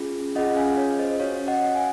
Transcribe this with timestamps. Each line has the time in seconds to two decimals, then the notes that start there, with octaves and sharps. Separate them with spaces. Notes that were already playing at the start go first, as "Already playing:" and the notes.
Already playing: C#4 F4 G#4
0.35 C#4 F4 G#4 D#5 F#5
0.56 F5 G#5
0.77 C#5 F5
0.99 C5 D#5
1.20 C#4 F#4 C#5 F5
1.48 D#5 F#5
1.75 F5 G#5